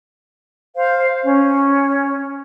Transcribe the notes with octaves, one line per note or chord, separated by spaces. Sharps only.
C5 F5
C#4